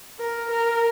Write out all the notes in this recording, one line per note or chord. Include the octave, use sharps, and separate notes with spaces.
A#4
A#4